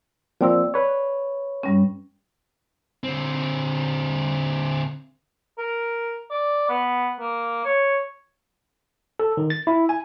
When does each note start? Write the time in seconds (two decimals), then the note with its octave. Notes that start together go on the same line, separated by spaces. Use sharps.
0.41 F3 A#3 C4 D5 G5 E6
0.74 B4 C#5
1.63 G2 G3 C#4
3.04 D3 C4
5.58 A#4
6.31 D5
6.69 B3
7.20 A#3
7.65 C#5
9.19 A4
9.37 D#3
9.50 A6
9.67 E4
9.89 G#5